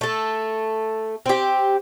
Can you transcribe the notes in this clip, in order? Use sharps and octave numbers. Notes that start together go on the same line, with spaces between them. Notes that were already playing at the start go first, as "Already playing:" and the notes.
A3 A4
C4 G4